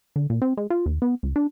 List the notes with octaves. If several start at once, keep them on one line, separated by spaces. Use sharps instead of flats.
D3
A#2
C4
G#3
F4
D#2
B3
C#2
D4